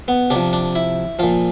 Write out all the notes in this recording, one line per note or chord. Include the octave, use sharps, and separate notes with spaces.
B3
C3 D4
F3
D4
E4
A#2 F3 F4